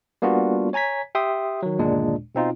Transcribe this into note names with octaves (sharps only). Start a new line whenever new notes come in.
G3 A#3 B3 D4 F4 F#4
C#5 G#5 A#5 G#6 B6
G4 E5 G5 C6 D#6
D#3 F#3
G1 D#2 A#2 G#3 D4
B2 C4 D#4 F4